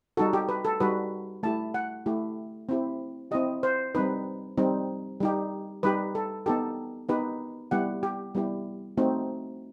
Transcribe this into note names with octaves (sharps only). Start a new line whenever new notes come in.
G3 D#4 F#4 A4
G4
B4
A4
G3 D#4 F#4 B4
A3 E4 G4 A5
F#5
A3 E4 G4
C4 E4 G4
C4 E4 G4 D#5
C5
G3 C4 D#4 B4
G3 C4 D#4
G3 D#4 G4
G3 D#4 G4 B4
A4
B3 D#4 G4 A4
B3 D#4 G4 B4
G3 B3 E4 G4 F#5
G4
G3 B3 E4 G4
A3 C4 D#4 F#4